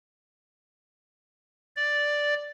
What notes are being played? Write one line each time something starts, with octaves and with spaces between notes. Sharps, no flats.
D5